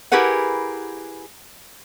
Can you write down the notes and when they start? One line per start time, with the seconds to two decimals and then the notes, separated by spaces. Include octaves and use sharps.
0.12 E4 G4 G#4 A#4 B4 F#5